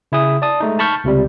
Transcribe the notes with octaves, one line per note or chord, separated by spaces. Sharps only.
C#3 E4 G#4 D#6
D5 A5 D#6
G#3 A3 D#4
A5 B5 C#6 F6 G6
C#2 C3 G3